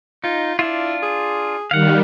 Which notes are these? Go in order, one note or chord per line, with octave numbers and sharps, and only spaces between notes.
D#4 F4
D4 E4 F4
G#4
D#3 G3 F5 F#5